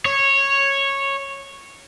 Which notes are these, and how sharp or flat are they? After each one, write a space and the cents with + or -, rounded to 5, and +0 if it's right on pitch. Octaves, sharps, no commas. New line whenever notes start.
C#5 -10